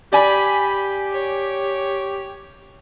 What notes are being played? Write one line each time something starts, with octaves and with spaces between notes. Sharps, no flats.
G4 D5 G#5 B5
C#5